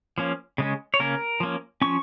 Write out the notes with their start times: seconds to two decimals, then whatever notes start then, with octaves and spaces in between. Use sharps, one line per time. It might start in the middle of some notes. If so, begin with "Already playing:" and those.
0.18 F3 A#3 C#4
0.58 C#3 G#3 C#4
0.94 C#5
1.00 C#3 A#3 C#4 A#4
1.40 F3 A#3 C#4
1.82 F3 C#4 C#6